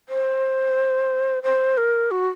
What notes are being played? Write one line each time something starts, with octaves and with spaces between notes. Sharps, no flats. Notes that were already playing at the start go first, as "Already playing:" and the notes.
C5
C5
A#4
F#4